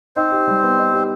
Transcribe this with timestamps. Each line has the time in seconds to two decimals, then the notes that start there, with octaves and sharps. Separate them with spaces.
0.16 C4 D#4 C5
0.32 G4
0.47 G3
0.63 B3
0.79 D#4
0.94 G4